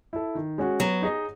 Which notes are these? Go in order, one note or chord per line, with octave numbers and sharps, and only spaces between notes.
E4 A4
D#3
G#3 C#4 F#4
F#3 B3
D#4 G#4 D#5